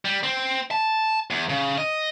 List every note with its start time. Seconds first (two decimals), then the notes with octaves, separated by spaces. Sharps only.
0.05 G3
0.23 C4
0.71 A5
1.30 E2
1.49 C#3
1.78 D#5